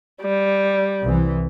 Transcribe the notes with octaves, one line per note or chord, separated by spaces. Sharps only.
G3
C2 E3